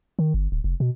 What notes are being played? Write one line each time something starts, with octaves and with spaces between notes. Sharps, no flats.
D#3
G1
D1
F1
B2